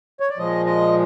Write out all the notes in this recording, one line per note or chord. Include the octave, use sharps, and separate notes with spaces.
C#5
D5
A#2 F3 G#3 D#5
D#5